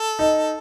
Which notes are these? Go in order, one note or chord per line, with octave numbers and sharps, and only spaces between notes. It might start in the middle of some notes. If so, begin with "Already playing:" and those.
Already playing: A4
D#4